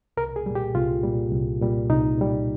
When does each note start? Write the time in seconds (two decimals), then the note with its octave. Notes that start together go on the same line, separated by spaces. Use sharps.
0.17 C2 A#4
0.36 G#4
0.46 A#2 G3
0.55 G4
0.75 C2 F4
1.03 A#2 G3
1.32 C2
1.61 A#2 G3
1.90 C2 D#4
2.18 A#2 G3